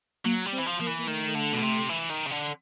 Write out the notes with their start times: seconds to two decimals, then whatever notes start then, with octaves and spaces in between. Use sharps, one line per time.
0.25 F#3 A#3
0.46 G3
0.52 C4
0.58 E3
0.66 F3
0.80 F3 A#3
0.87 E3
0.99 A#3
1.07 D#3 A3
1.35 D3
1.52 B2
1.62 C3
1.90 E3
2.10 D#3
2.26 C#3
2.31 D3